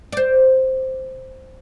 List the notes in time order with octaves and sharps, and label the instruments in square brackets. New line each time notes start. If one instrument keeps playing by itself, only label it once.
[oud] C5 D5